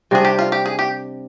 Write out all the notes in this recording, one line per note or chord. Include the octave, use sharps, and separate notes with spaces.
C3 G3 D4 G#4
G4
F4
G4
G#4
G4